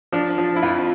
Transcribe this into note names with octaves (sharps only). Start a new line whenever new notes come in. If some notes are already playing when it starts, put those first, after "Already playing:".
F3 D4
F3
E4
F2 F4